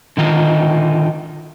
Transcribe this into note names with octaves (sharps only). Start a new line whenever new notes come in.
D3 D#3 D#4 F4